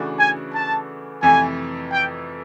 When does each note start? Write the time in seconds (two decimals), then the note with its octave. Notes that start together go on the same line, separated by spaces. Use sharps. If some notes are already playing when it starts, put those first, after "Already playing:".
Already playing: C#3 E3 A3 D4 F#4
0.19 G#5
0.54 A5
1.23 F2 C3 E3 A3 G#5
1.92 G5